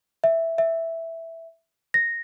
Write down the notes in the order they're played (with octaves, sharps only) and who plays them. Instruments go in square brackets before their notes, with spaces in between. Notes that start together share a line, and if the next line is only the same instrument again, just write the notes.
[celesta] E5
E5
A#6